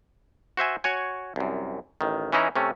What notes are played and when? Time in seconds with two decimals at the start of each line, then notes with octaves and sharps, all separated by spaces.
0.57 F#4 C5 E5 G#5
0.84 F#4 C#5 G#5
1.36 C2 F#2
2.01 A1 D#3
2.32 E3 C#4 D#4 E4 A#5
2.56 C3 A3 C#4